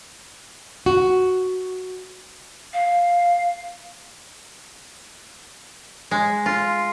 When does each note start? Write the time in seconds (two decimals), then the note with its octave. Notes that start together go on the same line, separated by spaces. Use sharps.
0.86 F#4
2.73 F5
6.11 G#3
6.46 F4